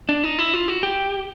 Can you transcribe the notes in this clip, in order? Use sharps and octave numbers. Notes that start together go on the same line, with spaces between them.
D4
D#4
E4
F4
F#4
G4